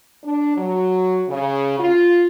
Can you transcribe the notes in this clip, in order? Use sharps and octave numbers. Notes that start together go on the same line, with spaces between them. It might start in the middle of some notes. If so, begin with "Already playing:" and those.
D4
F#3
C#3
F4